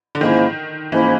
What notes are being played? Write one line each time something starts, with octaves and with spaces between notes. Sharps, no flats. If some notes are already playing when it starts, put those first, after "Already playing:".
D3
G#2 D#3 F3 A#3 C#4 E4
G#2 E3 F3 A#3 C#4 E4